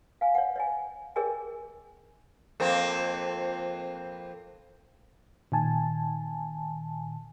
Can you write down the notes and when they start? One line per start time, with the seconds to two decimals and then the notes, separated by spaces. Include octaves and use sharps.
0.21 F5 G#5
0.35 C#5 F#5
0.56 C#5 D#5 G#5
1.16 G#4 A#4 C#5 D#5 G5 G#5
2.60 F2 A#3 C4
5.52 A#2 D#3 G#5 A5